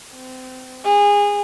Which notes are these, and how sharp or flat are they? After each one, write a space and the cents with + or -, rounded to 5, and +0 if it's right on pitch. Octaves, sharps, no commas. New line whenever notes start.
C4 -30
G#4 -25